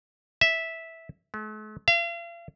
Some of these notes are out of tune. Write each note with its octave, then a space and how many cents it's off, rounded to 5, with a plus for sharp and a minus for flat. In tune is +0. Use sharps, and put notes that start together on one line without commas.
E5 -10
A3 -45
F5 -40